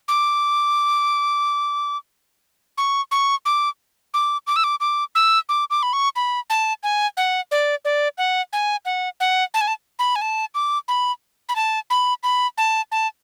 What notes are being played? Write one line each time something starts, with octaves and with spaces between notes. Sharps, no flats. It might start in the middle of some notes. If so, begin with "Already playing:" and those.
D6
C#6
C#6
D6
D6
D6
E6
D6
D6
E6
D6
D6
B5
C#6
B5
A5
G#5
F#5
D5
D5
F#5
G#5
F#5
F#5
A5
G#5
A5
B5
G#5
A5
D6
B5
B5
A5
B5
B5
A5
A5